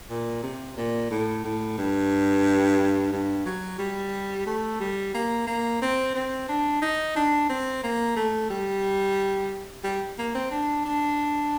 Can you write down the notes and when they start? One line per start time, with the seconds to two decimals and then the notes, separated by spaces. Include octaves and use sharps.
0.10 A#2
0.43 C3
0.77 A#2
1.11 A2
1.45 A2
1.78 G2
3.12 G2
3.46 F#3
3.79 G3
4.47 A3
4.80 G3
5.14 A#3
5.47 A#3
5.82 C4
6.15 C4
6.49 D4
6.82 D#4
7.16 D4
7.49 C4
7.83 A#3
8.16 A3
8.50 G3
9.84 G3
10.19 A#3
10.35 C4
10.51 D4
10.85 D4